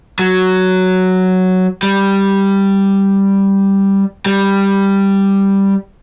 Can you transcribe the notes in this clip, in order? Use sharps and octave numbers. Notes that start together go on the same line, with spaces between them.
F#3
G3
G3